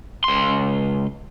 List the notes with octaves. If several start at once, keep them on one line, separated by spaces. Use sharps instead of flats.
C#2 C6